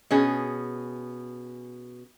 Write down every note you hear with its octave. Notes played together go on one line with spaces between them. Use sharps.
B2 C#4 G#4